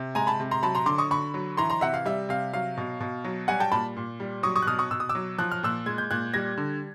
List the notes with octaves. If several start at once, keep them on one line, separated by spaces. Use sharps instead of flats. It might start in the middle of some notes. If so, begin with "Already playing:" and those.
Already playing: C3
G#3 G#5 A#5
A5 B5
C3
A#5 C6
F#3 A5 B5
A#5 C6
D3 C6 D6
C#6 D#6
D3 B5 C#6
F#3
E3 A#5 C6
A#5 C6
C3 E5 F#5
F5
G3 E5
C3 F5
F#3 F5
B2
B2
F#3
G3 F#5 G#5
G5 A5
A#2 A5 B5
A#2
G3
F#3 C#6 D#6
C#6 D#6
F#6
B2 D#6 F6
C#6 D#6
B2 E6
D#6
D6 E6
F#3
F3 F#6
F6
A#2 E6 F#6
G#3 G#6
G6
A#2 F#6 G#6
G3 G#6 A#6
D3